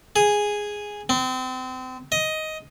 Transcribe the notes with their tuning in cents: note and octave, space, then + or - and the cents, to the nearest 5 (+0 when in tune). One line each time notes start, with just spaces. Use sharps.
G#4 -5
C4 -30
D#5 +10